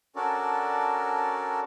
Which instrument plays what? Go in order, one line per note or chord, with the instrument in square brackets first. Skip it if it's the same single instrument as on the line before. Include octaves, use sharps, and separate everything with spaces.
[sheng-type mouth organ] C#4 D4 F#4 A4 A#4 D5